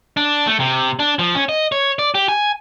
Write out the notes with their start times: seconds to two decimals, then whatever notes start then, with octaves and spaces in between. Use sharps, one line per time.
0.17 D4
0.47 A3
0.60 C3
0.99 D4
1.19 F3
1.35 C#4
1.49 D#5
1.72 C#5
1.99 D5
2.15 G4
2.29 G#5